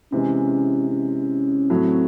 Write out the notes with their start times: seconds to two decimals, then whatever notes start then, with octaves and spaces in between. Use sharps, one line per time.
0.12 C3 E3 G#3 C#4
0.91 C#4
1.70 A2 F#3 A3 C4